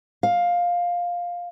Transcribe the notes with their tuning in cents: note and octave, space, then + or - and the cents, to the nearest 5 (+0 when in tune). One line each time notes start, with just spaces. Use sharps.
F5 +10